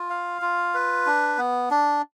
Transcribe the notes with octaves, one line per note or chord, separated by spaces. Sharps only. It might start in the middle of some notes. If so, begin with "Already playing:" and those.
Already playing: F4
F5
F4
B4
D4
B3
D4